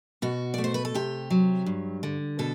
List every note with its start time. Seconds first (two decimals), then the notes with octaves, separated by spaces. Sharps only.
0.22 B2 F#4
0.54 A3 D5
0.64 C5
0.74 B4
0.85 A4
0.94 C3 G4
1.30 F#3
1.66 G2
2.03 D3
2.39 B2 A4